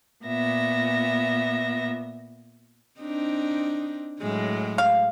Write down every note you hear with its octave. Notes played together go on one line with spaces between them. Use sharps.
A#2 B3 E5 A#6
C4 D4 D#4
A2 F#3 G#3
F5